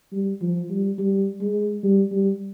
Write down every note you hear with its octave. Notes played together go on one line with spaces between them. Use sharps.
G3
F3
G3
G3
G#3
G3
G3